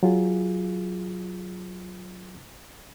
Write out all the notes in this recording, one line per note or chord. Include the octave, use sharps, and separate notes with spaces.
F#3 F4 G#4